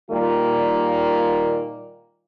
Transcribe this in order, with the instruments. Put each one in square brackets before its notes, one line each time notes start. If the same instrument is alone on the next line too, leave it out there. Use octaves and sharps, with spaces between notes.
[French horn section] A#2 D#3 G3 A#3 F4